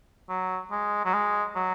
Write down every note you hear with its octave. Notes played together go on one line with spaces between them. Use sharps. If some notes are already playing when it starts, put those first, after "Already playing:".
F#3
G#3
F#3
G#3
F#3